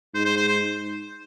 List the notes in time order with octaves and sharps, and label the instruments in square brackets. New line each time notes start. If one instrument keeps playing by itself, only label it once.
[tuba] G#2 [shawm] C5
[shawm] C5
C5
C5